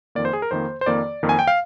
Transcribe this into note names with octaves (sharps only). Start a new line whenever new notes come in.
F2 D#3 A#3 D5
C5
G#4
A#4
F2 D#3 A#3 C5
C5
F2 D#3 A#3 D5
F2 D#3 A#3
G#5
G5
F5